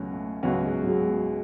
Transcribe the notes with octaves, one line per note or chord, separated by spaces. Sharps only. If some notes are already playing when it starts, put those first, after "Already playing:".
Already playing: C#2 B2 F#3 A3 C#4 F#4
A3
C#2 B2 F#3 B3 C#4 F#4
G#3
F#3
G#3
F#3